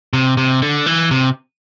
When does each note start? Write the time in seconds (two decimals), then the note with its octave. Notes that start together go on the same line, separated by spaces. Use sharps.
0.13 C3
0.37 C3
0.62 D3
0.86 E3
1.11 C3